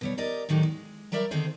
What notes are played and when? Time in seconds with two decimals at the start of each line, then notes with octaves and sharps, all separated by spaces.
0.01 B2 G3 C#5
0.18 G4 A#4 D5 D#5
0.49 A2 D#3 F#3 D#4 G4
0.63 G#3
1.12 F#3 G3 A#4 D5 E5
1.31 D3 D#3 C4 D#4 G#4 C5